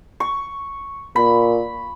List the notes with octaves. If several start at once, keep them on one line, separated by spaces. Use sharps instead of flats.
C#6
A#2 B5